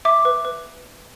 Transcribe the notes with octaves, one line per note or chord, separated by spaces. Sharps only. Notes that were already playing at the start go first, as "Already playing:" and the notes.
E5 D6
B4
B4